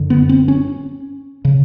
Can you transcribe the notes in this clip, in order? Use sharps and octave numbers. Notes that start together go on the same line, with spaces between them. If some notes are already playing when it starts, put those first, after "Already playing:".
Already playing: F#2 D3
B3
C4
C#4
C#3